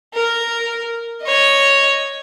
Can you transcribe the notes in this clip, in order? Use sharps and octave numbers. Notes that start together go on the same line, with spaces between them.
A#4
C#5 D#5